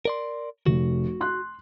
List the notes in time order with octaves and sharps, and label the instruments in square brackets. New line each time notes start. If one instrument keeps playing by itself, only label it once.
[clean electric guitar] A#4 D5 C6
[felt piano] F1 [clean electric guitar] F#4
[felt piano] C6 F#6